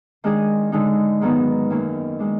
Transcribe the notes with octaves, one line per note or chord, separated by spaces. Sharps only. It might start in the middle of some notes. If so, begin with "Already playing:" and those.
D#3 G#3 D4 G#4
D3 G#3 D#4
G#2 D#3 F#3 B3 D#4
F#2 D#3 F#3 A#3
D#3 G#3 D4